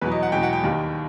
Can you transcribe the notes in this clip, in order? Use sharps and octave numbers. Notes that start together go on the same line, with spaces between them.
E2 B2 F#3 B4
D#5
F#5
E2 B2 F#3 G5
F#5
G5
D#2 D#3 G3